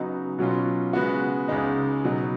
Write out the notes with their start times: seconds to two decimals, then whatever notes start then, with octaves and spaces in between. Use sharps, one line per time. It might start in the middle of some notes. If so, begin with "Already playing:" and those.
Already playing: C#3 F#3 B3 D#4 F#4
0.38 B2 F#3 C#4 F4
0.93 C#3 G#3 B3 F#4
1.48 C#2 C#3 G#3 D#4
2.04 B2 F#3 B3 D#4